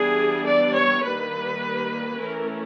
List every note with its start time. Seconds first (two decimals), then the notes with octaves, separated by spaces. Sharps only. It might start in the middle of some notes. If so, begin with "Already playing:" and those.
Already playing: E3 G3 B3 D4 G#4
0.47 D5
0.76 C#5
1.05 D#3 G3 A#3 B4
2.18 E3 A3 C#4 A#4